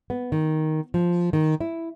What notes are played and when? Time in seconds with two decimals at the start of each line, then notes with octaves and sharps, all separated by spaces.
0.10 B3
0.32 D#3
0.94 F3
1.33 D#3
1.60 E4